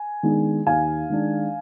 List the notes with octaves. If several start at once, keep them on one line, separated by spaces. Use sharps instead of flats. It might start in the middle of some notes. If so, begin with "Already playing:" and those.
Already playing: G#5
D#3 G#3 B3 D4
D#2 F5 G#5
D#3 G#3 D4